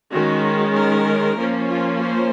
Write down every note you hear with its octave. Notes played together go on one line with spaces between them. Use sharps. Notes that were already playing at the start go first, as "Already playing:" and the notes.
D#3 G#3 C#4 F#4
A#4
F3 A#3 C#4
F4
C5